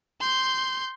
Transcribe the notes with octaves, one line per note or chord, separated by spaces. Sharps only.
C6 G6